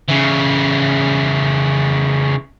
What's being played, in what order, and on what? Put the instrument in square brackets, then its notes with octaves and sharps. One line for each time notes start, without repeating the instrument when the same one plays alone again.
[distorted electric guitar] C#3 E3